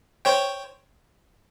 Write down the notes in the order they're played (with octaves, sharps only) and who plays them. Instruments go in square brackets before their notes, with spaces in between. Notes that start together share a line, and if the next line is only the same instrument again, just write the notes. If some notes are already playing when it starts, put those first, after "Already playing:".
[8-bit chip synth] C5 C#5 G5